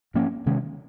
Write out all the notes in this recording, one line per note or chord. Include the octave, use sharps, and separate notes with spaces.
G#2 F3 A#3 C#4
C3 D#3 G#3 C#4